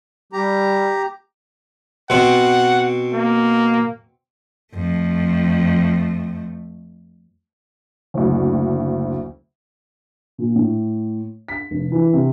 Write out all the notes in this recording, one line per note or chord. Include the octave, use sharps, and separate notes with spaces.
G3 G4 A#5
B2 C4 F#5
A#3
F2 A3
F#1 D2
A#2
A2
B6
F1
E3
C3